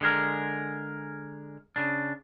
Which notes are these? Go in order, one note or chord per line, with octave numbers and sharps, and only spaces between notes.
D3 G#3 G#4 A#4
C#3 D4